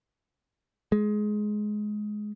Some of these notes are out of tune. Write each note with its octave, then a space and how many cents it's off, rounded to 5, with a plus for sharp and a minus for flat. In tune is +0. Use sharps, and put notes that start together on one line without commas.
G#3 +15